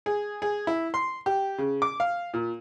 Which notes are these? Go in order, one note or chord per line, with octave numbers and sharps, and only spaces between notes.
G#4
G#4
E4
C6
G4
C#3
D6
F5
A#2